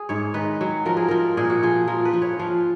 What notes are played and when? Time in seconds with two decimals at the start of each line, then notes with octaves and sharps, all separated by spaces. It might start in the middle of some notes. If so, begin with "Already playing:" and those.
Already playing: G#4
0.09 G#2 C#5
0.34 D#3 B4
0.61 F#3
0.86 F3 A#4
0.97 G#4
1.08 F3 A#4
1.37 A#2 G#4
1.50 F#4
1.63 F3 G#4
1.87 F3 A#4
2.05 B4
2.13 F3
2.22 C#5
2.39 F3 F5